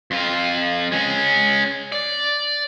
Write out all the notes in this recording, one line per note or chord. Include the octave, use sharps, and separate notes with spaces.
F2 F4
G#3 C#4
D5